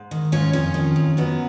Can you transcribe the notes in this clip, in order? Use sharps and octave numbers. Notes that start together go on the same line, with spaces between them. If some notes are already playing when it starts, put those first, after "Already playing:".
Already playing: G#2
D#3
G#2 C#4 F4
F2 C#4 F4
D#3
F2
F#2 B3 D#4